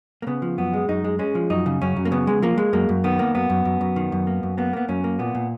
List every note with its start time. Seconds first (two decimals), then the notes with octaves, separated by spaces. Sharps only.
0.22 A#3
0.27 C#3 B3
0.42 F3
0.58 F#2 B3
0.73 G#3
0.88 F#2 D#4
1.04 G#3
1.19 G#3 C#4
1.35 F3
1.50 F#2 D#4
1.66 C#3
1.81 F#2 C#4
1.96 F#2
2.05 A#3
2.12 C#3 B3
2.27 G#3
2.42 F3 A#3
2.58 G#3
2.73 F#2 A#3
2.89 F#2
3.04 D#3 B3
3.19 A#3
3.35 F#2 B3
3.50 F#2
3.65 F#2
3.81 F#2
3.96 D#3
4.12 F#2
4.27 A#3
4.43 F#2
4.58 A#3 B3
4.73 A#3 B3
4.88 F#2 C#4
5.04 A#3
5.19 A#2 B3
5.35 A#2